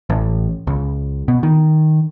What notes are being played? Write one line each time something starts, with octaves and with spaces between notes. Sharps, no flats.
A1
C#2
B2
D#3